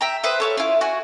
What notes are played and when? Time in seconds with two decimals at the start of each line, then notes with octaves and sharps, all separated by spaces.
0.01 E5 G5 A#5
0.24 B4 C5 E5 D#6
0.40 A4 C#5 F5
0.57 E4 F4
0.81 F#4 G#5